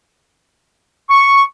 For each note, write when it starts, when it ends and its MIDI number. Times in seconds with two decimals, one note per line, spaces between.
1.10 1.43 85